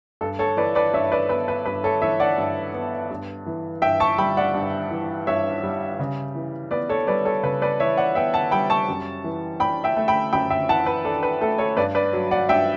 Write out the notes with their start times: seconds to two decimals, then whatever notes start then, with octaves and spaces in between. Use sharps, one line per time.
0.21 G2 A4
0.39 A4 C#5
0.57 E3 B4 D5
0.75 B4 D5
0.93 G2 C#5 E5
1.12 B4 D5
1.29 B3 B4
1.48 B4
1.66 G2 B4
1.84 A4 C#5
2.02 E3 C#5 E5
2.20 D5 F#5
2.38 G2
2.74 B3
3.10 G2
3.46 E3
3.82 G2 E5 G5
4.00 A5 C#6
4.18 G3 G5 B5
4.37 D5 F#5
4.54 G2
4.91 E3
5.27 G2 C#5 E5
5.63 G3
5.99 C#3
6.35 E3
6.71 B3 B4 D5
6.89 A4 C#5
7.07 G3 B4 D5
7.25 A4 C#5
7.43 C#3 B4
7.62 B4 D5
7.80 E3 C#5 E5
7.97 D5 F#5
8.15 B3 E5 G5
8.34 F#5 A5
8.51 G3 G5 B5
8.70 A5 C#6
8.88 F#2
9.24 E3
9.60 D4 G5 B5
9.84 E5 G5
9.97 A3
10.08 G5 B5
10.33 F#2 G5 B5
10.50 E5 G5
10.69 E3 F#5 A5
10.86 B4
11.05 D4 A4
11.23 B4
11.41 A3 A4
11.58 A4 C#5
11.77 G2 B4 D5
11.95 B4 D5
12.13 F#3
12.31 D5 F#5
12.49 G2 E5 G5